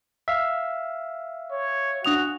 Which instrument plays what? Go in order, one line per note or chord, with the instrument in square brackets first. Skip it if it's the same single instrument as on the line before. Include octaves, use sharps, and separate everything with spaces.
[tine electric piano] E5 F5
[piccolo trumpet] C#5
[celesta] D4 D#6 F7 [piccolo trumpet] F#4